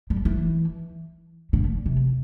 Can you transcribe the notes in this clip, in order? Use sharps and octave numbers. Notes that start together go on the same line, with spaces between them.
G3
E3
D3
C3